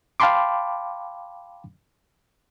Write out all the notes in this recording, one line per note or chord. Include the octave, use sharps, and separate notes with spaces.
F5 G5 A5 B5 C6 D6